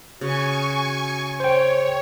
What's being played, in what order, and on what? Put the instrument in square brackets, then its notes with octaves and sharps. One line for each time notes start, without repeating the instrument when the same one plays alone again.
[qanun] C#3 [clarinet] F#4 [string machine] G#5 C#6
[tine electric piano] C5 G5 [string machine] C#5